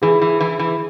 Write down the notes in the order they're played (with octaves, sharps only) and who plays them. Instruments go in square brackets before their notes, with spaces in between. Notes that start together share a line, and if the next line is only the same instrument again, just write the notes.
[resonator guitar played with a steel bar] E3 [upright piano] G#4
[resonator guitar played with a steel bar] E3
E3
E3